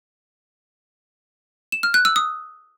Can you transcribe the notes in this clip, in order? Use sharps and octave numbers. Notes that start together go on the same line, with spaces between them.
E7
F6
F#6
E6
D#6